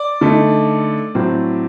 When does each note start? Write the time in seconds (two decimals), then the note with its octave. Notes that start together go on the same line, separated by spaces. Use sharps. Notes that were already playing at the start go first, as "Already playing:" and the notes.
Already playing: D5
0.21 D3 A3 D#4
1.15 A2 F#3 C4